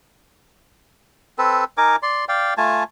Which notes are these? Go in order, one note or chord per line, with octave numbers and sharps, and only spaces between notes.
C4 A4 B4
D#4 A#4 G#5 D6
D5 C6
D5 F5 G5
A3 F4 G#5 A5